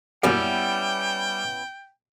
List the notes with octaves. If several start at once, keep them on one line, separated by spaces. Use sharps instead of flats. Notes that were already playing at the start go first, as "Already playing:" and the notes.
F#2 A#2 G3 B3 C#4 E4 G5